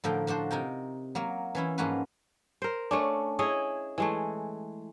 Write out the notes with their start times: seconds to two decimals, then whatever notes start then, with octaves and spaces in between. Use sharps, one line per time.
0.04 A2 D3 F3 A#4 G5
0.27 F3 D4 F#4 C5
0.51 C3 D#4 A#4 G5
1.15 F#3 A#3 A#4
1.55 E3 C#4 E4
1.78 G#2 F3 A#3 C#4 F#4 B4
2.62 A#4 C5
2.91 A3 C#4 D4
3.39 E4 G#4 C#5 D#5
3.98 E3 G#3 A3